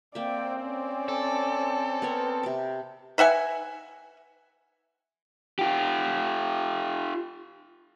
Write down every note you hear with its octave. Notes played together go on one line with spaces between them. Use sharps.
A#3 C4 D5 E5 G5
C#4 D5
A4
B3 A#4 C#5
C3 D6
B4 E5 F#5 G#5
F4 G4